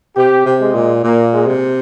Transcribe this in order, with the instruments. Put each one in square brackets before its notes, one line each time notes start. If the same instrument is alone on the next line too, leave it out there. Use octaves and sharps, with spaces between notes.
[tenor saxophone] C3 [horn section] G4
[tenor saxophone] C3
[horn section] G#3
[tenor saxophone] A#2
[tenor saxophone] A#2 [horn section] A#3
[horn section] G#3
[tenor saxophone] C3